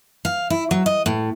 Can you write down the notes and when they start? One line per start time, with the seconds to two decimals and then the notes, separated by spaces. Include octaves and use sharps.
0.25 F5
0.50 E4
0.71 F#3
0.86 D#5
1.06 A2